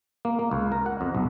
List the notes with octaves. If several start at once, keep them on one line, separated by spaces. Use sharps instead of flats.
A#3
A#3
C#2
A#4
F#5
F2
B1